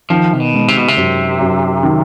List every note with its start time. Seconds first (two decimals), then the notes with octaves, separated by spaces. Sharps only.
0.10 D#3 F3
0.33 C3
0.40 B2
0.54 G#3
0.68 C3
0.77 B2
0.88 C3
0.97 F#2
1.41 F#2
1.83 D#3